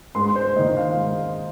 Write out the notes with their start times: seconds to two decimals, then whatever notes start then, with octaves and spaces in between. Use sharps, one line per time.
0.15 G#2 C6
0.36 C5
0.56 A#3 D#5
0.59 D#3
0.77 F5
0.96 G#2